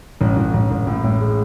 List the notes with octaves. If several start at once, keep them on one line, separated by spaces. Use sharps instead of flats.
A1
A1
A1
A1
A2
A2
G#3